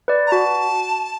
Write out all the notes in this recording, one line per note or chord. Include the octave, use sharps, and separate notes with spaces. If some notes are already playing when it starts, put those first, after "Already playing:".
B4 D5
A#5
F#4 A5